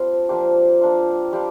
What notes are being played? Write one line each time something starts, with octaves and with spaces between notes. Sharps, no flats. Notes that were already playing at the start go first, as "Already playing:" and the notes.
Already playing: G3 C4 D4 F4
F3 A#3 D4 F4 G4
A#3 D4 F4
G3 D4 F4 G4